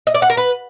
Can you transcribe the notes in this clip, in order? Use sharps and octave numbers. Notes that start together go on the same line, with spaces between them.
D#5
D5
F#5
A#4
B4